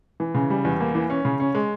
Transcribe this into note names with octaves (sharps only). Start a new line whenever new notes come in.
E3
C#3
G3
E2
A#3
E3
C#4
C#3
C#4
G#3